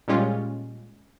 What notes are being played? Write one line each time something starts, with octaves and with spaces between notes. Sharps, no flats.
A#2 G3 G#3 C#4 F4 G4